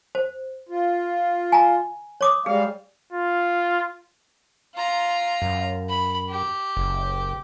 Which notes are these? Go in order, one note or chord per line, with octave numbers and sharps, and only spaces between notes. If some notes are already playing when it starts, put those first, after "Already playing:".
C5
F4
G#5 A#5
C#5 D6 D#6
G3 G#3 G#4 F5
F4
F4 A#5
F#2
B5
G4
F#1